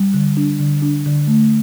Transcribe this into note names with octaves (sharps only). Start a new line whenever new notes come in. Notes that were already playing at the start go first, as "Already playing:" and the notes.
Already playing: G3
D3
D4
D3
D4
D3
A3